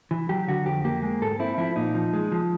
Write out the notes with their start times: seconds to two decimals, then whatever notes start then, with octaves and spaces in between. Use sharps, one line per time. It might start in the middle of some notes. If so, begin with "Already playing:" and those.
0.11 E3
0.29 F#3 G4
0.48 D3 F#4
0.66 F2 G4
0.84 A#3 G4
1.02 G#3
1.22 G#2 A4
1.39 C4 E4
1.58 F3 E4
1.76 A#2 D#4
1.94 F3
2.13 G#3
2.32 F3